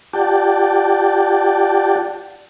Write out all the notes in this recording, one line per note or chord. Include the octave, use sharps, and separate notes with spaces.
F4 G4 D5 F#5 G5 A5